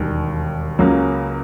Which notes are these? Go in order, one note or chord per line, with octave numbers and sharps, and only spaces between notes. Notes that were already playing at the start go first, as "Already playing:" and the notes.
Already playing: E1 D#2 D#3 G3
C#2 C#3 F#3 A#3 C#4